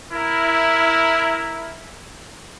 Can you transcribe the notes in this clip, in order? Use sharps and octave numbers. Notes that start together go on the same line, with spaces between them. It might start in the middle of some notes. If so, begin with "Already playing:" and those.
E4 A#4